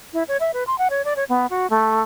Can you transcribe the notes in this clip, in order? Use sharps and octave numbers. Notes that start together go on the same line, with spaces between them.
E4
C#5
E5
B4
C6
F#5
C#5
D5
C#5
B3
F#4
A3